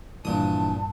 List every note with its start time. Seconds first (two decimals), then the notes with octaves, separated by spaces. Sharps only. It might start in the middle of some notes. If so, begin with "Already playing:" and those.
0.25 G2 A#2 E3 F3 D4 A5 D#6